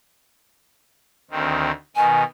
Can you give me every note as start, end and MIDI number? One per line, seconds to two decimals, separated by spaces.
1.31 1.71 38
1.31 1.71 51
1.31 1.71 60
1.96 2.24 47
1.96 2.24 51
1.96 2.22 80